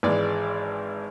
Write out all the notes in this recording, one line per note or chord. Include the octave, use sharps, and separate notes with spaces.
G#1 E3 G#3 D5